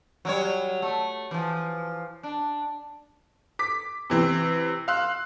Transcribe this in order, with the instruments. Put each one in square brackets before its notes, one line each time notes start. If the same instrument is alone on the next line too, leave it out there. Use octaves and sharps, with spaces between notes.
[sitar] F#3 G3 C#5
A3
E3 F3
D4
[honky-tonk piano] D6 B6
C3 E3 C4
F5 C6 E6 F#6